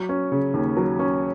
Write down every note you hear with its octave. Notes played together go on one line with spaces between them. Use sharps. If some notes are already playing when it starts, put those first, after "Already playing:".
Already playing: F#3
C#4
C#3
D#2
F#3
C#4